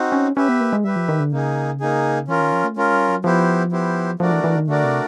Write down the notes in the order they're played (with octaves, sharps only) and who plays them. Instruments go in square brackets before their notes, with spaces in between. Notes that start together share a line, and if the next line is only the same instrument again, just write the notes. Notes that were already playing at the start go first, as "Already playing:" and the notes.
Already playing: [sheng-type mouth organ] C4 D#4 F#4
[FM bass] C#4
[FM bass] C#4 [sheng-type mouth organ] G4 B4 E5
[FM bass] B3
A#3
G#3
[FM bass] G3 [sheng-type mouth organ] G4 B4 E5
[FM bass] F3
D#3
D3
[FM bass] C#3 [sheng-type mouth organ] A#3 D#4 G#4
[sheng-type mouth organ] A#3 D#4 G#4
[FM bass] E3 [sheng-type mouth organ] C#4 F4 A#4
[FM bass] D#3
F3
A3
[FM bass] G#3 [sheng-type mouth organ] C#4 F4 A#4
[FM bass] G3
F#3
[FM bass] F3 [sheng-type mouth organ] B3 E4 G4 C5
[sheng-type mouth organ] B3 E4 G4 C5
[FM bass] F3 [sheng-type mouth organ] A3 D4 F#4 A#4 D5
[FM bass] E3
E3
D#3
[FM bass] D3 [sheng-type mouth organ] A3 D4 F#4 A#4 D5
[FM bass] C3